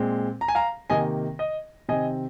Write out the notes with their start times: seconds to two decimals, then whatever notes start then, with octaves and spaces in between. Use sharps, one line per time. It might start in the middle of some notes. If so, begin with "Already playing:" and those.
Already playing: A#2 G#3 C4
0.41 A#5
0.48 G#5
0.55 F5 A#5
0.90 C3 D#3 A#3 D#5 G#5
1.39 D#5
1.89 C3 D#3 C4 D#5 G#5